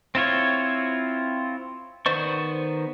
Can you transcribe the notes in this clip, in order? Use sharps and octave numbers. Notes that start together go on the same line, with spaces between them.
C4 E4 F4 C#5
D#3 B3 C5 D5 C#6